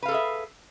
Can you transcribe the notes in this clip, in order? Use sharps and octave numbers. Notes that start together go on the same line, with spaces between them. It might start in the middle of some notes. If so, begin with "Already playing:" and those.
G#4 A4 B4 E5 F5